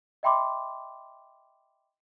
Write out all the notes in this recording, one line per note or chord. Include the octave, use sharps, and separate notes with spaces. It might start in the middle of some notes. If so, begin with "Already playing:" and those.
D#5 E5 G5 B5 C6 D6